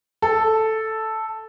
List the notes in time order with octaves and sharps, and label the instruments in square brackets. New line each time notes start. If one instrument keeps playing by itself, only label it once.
[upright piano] A4